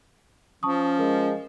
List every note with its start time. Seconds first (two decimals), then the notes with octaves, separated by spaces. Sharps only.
0.63 F3 C#4 A5 C#6 D#6
0.99 G#3 A#4